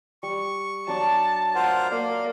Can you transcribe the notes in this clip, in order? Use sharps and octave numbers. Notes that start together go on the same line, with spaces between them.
G3 C#6
F#3 D4 D5 A5
F4 A#4 C5 F#5
A#3 D5 F5